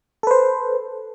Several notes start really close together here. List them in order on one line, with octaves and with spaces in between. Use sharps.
A4 B4 C5